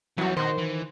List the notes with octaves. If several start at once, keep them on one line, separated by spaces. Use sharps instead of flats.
F2 E3 F#3 G3 F#4
D#3 F#4 C5 D#5
E3